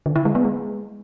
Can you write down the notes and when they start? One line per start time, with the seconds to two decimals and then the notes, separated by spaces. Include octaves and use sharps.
0.06 D3
0.16 E4
0.25 G#3
0.35 B3
0.45 G#3